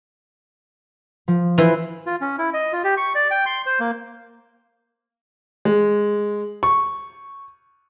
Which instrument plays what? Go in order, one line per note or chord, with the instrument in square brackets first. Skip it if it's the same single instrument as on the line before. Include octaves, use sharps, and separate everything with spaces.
[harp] F3
[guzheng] E3 [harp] E4 C5
[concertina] F4
C#4
E4
D#5
F4
G4
C#6
D5
G5
C6
C5
A#3
[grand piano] G#3
C#6